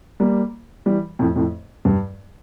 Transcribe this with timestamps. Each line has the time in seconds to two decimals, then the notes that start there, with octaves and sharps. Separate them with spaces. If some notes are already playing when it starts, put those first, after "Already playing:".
0.20 G3 A#3
0.86 E3 G3
1.19 F2 A2
1.36 F2 A2
1.85 G2